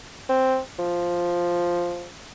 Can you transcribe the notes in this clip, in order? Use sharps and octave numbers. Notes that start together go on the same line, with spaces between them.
C4
F3